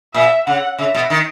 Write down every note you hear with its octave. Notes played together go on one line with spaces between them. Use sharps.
A#2 E5
C#3 F#5
C#3 E5
B2
D#3